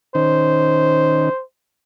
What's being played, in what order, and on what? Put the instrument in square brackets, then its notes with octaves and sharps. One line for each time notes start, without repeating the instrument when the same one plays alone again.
[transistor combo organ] D#3 C#4 D#4 [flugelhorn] C5